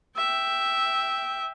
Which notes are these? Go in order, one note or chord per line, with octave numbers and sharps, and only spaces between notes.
E5 G5